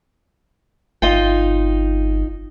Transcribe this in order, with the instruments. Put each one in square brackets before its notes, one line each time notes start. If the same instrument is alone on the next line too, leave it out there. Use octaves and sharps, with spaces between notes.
[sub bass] G1 [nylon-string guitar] D#4 F4 G5